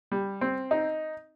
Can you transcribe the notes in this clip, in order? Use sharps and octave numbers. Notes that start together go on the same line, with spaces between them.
G3
C4
D#4